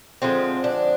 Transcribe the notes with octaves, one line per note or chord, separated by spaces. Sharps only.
D3 F3 G#3 C4
D4